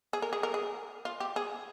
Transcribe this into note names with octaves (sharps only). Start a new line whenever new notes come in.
G#4
A#4
G#4
A#4
G#4
F4
G4
G#4